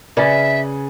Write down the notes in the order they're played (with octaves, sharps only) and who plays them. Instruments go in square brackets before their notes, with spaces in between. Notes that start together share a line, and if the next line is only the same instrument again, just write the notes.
[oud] C#3 [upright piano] B4 G#5 A6 [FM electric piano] D5 [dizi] E5